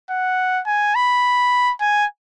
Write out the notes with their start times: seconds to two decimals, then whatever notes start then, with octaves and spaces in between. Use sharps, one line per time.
0.10 F#5
0.67 G#5
0.95 B5
1.81 G#5